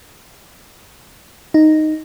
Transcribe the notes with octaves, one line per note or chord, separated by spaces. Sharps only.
D#4